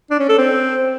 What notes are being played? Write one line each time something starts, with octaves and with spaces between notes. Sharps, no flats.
D4
C#4
A4
C4